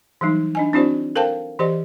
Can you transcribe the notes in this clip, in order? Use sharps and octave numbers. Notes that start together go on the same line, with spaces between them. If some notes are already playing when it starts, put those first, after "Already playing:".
E3 F#3 G3 D#4
D4 D#5 G#5
C4 D4 E4 F#4 C5 D5
A4 A#4 C5 F5 G5 A5
E3 G4 C5 D5 D#5